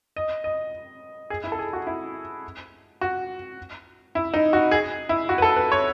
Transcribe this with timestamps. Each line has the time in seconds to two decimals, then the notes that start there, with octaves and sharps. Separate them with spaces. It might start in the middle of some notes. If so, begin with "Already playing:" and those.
0.16 D#5
0.44 D#5
1.30 G#4
1.44 E4
1.52 A4
1.59 G#4
1.73 F#4
1.87 E4
3.01 F#4
4.15 E4
4.34 D#4
4.53 F#4
4.71 G#4
5.09 E4
5.29 F#4
5.38 B4
5.42 A4
5.56 B4
5.72 C#5